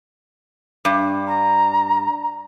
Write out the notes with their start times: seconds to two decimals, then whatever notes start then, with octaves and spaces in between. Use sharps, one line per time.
0.85 G2
1.28 A#5